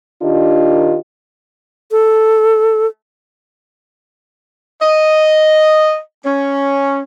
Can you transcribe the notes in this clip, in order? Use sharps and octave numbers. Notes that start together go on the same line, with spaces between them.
D#3 D4 F4 G4 A#4 D#5
A4
D#5
C#4